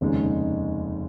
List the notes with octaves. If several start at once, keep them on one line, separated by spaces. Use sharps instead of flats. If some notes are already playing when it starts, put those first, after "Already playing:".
F1 D#2 C#3 G#3 D#4